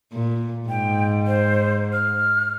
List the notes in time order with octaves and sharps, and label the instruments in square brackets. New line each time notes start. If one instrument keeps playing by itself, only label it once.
[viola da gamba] A#2
[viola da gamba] G#2 [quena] G5
[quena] C5
F6